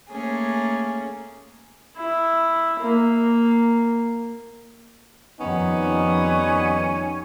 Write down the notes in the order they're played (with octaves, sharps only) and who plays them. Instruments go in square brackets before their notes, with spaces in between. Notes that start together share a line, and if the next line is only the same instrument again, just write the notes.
[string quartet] A3 A#3 C#4 G#4
[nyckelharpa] E4
A#3
[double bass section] F2 [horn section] D#3 G3 B3 [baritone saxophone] C#4 [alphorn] D#4